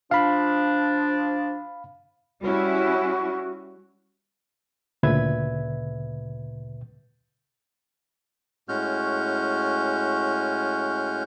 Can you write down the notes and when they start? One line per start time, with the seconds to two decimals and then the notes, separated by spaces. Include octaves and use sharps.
0.11 F3 D4 F5 B5
2.41 G3 C#4 E4 F#4
5.03 D2 A#2 C#3 B4 E5 G#6
8.69 A2 G#3 C#4 F#4 F6 G6